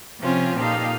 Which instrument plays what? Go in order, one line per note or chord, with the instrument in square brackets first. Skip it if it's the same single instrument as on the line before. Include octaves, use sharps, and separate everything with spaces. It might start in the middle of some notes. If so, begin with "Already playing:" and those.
[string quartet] C3 F3 C4 C#4 F4
A#2 D#4 G4 A4 F5